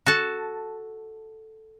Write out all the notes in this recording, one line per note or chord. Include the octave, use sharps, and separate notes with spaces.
F#4 A4 A5